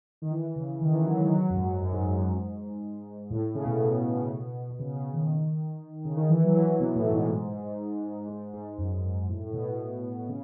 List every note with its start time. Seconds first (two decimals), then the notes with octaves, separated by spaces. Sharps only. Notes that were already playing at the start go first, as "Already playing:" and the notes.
0.22 D#3
0.31 E3
0.56 C#3
0.81 D#3
0.93 E3
1.06 F#3
1.18 G#3
1.31 F#3
1.50 F#2
1.56 G#2
1.81 F#2
1.93 G#2
2.06 F#2
2.18 G#2
3.30 A2
3.55 C#3
3.65 B2
3.75 A2
3.85 B2
4.70 B2
4.79 C#3
4.96 C#3
5.13 D#3
6.05 C#3
6.17 D#3
6.29 E3
6.44 F#3
6.55 E3
6.80 B2
6.95 A2
7.12 G#2
8.29 G#2
8.53 G#2
8.78 F#2
9.03 G#2
9.28 A2
9.46 A2
9.53 B2
10.28 C#3